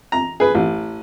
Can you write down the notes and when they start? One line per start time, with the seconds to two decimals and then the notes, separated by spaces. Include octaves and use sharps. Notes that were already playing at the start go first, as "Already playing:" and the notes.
0.12 A#5
0.40 G#4 B4
0.54 A1